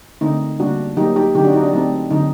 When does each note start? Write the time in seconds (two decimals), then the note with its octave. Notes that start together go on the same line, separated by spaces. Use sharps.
0.21 D3 A3 C4 D#4
0.59 D3 G3 A#3 D4 F#4
0.97 F#3 A#3 D#4 G4
1.16 D#4 G4
1.35 D3 F#3 C4 D#4 G4
1.44 D4 F#4
1.53 D#4
1.63 D4
1.73 F#3 A3 C4 D#4
2.11 D3 F#3 C4 D#4